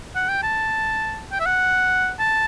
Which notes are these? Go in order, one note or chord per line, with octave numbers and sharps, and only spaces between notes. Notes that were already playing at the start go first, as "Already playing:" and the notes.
F#5
G5
A5
G5
E5
F#5
A5